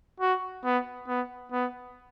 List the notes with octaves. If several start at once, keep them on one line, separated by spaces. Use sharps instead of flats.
F#4
B3
B3
B3